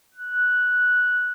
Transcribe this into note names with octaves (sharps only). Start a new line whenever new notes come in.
F#6